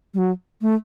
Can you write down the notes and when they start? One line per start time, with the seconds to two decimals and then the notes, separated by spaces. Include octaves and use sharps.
0.14 G3
0.18 F#3
0.62 A3